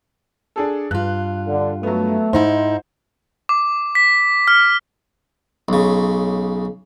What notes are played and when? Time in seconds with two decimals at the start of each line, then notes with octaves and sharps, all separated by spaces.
0.56 D4 G#4 A4
0.91 G2 F4 F#6
1.47 D3
1.83 F#3 A3 B3
2.33 G#2 D#4 E4 C5
3.49 D6
3.95 B6
4.48 F6
5.69 B1 C#3